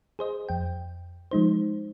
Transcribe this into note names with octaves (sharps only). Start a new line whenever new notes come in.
G#4 C5 D#5
F2 G5
F3 G#3 D#4 C5